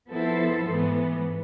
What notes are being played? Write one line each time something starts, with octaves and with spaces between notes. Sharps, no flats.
F3 B3 E4 A4 C5
G#2 E3 B3